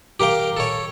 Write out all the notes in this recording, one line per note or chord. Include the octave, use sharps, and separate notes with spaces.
G4 A#4 F5 G5
A4 C#5